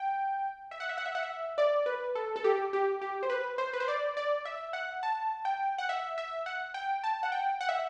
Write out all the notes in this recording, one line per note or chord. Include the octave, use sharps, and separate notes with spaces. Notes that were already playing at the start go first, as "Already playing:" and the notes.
Already playing: G5
E5
F#5
E5
F#5
E5
F#5
E5
D5
B4
A4
A4
G4
G4
G4
C5
B4
C5
B4
C5
D5
D5
E5
F#5
A5
G5
F#5
E5
E5
F#5
G5
A5
F#5
G5
F#5
E5